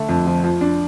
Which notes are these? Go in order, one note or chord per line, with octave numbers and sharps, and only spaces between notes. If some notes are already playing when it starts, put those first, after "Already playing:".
Already playing: D3 A3 D4
F2
F3
F3
D4